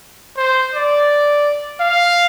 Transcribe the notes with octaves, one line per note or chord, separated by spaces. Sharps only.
C5
D5
F5